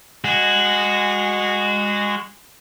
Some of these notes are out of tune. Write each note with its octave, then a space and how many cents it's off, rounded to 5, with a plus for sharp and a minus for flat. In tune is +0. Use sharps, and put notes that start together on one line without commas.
G#3 -20 F#4 -5